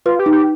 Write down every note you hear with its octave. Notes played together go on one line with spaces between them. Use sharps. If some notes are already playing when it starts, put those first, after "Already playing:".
F4 B4
G4
D#4
G4